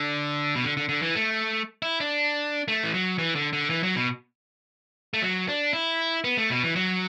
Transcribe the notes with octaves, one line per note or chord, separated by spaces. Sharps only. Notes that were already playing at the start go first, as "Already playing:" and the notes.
Already playing: D3
B2
D3
D3
D3
E3
A3
E4
D4
A3
E3
F#3
E3
D3
D3
E3
F#3
B2
A3
F#3
D4
E4
B3
A3
B2
E3
F#3